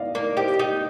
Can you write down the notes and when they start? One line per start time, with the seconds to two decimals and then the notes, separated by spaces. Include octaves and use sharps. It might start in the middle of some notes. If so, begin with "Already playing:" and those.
Already playing: D5 D#5 F5
0.15 A#3 D5
0.37 G4 C5 D#5
0.59 D#4